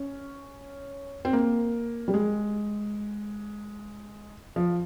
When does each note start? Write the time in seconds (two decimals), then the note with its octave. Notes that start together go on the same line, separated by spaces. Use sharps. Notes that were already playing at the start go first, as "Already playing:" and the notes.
Already playing: C#4
1.25 C4
1.33 A#3
2.08 G3
2.14 G#3
4.56 F3